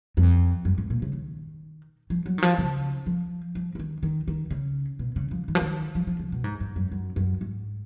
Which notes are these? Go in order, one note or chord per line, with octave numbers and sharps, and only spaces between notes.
F2
F#2
G#2
A#2
C#3
D#3
F3
F#3
D#3
F3
C#3
F3
F3
F3
D#3
D#3
D#3
C#3
B2
C#3
F3
D#3
F3
D#3
F3
F3
C#3
B2
G#2
G#2
F#2
F#2
F#2
G#2